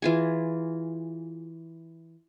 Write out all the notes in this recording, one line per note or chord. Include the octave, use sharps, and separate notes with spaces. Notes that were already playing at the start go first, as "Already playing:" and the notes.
E3 F4 G#4